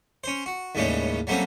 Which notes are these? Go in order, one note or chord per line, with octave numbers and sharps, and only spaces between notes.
C#4 C5
F#4
D#2 A2 C#3 G3 G#3 C#4
F#3 G3 A3 A#3 C4 C#4